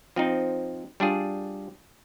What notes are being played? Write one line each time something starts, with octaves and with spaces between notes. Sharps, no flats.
F3 C4 D#4
G3 D4 F4 G#4